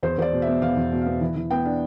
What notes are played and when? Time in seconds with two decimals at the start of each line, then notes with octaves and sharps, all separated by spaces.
0.03 E2 C5
0.18 E2 C5
0.22 D5
0.32 B2
0.42 B3 E5
0.62 E2 F5
0.76 E2
0.91 B2
1.01 B3 F5
1.21 E3
1.36 E3
1.51 B3 G5
1.65 D4